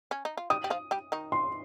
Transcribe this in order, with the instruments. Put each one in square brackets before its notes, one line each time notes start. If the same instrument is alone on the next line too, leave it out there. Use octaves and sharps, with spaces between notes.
[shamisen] C#4
D#4
F4
[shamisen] G3 G4 [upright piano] D#6
[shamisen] G4
F3 F4
G3 G4
D#3 D#4
[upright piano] C6